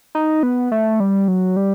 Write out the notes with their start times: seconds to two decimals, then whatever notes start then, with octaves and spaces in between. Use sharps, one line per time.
0.15 D#4
0.43 B3
0.72 A3
1.00 G3
1.28 F#3
1.57 G3